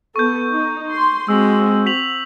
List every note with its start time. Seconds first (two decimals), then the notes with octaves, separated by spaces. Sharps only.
0.16 B3 A4 C#6 G6
0.51 D#4
0.92 C6
1.28 G#3 C4 F#4 E6
1.86 B6 F7 F#7